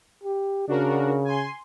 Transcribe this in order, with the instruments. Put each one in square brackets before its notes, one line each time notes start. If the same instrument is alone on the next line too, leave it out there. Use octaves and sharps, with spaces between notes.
[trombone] G4
[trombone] C#3 [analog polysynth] D4 F#4 A#4
[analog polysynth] G#5 C6